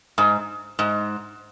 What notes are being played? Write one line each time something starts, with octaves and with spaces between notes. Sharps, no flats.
G#2
G#2